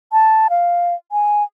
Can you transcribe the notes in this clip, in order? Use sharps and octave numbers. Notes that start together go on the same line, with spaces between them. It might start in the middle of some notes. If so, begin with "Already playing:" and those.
A5
F5
G#5